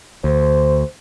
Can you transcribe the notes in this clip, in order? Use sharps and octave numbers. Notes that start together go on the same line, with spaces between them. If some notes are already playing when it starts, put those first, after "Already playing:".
D2 C5